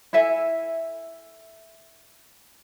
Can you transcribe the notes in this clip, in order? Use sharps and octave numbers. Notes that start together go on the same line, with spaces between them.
E4 A4 E5 G#5